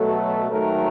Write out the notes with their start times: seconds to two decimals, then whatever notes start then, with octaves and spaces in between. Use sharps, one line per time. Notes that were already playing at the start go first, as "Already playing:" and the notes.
Already playing: B2 F#3 A3 A4
0.51 G#2 D#3 F#3 A3 A#4